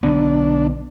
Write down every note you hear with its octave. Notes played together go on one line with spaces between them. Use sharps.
B1 D3 B3 D4